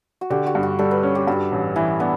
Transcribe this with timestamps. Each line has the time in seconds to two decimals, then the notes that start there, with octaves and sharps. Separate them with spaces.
0.21 F#4
0.30 D3 G4
0.47 F#4
0.55 G2
0.63 F#4
0.79 G3 A4
0.91 B4
1.03 C#4
1.15 G4
1.27 G2 F#4
1.52 A1
1.76 E3 E4
2.00 B3 D4